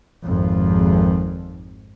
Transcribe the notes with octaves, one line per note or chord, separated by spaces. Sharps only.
G#1 F2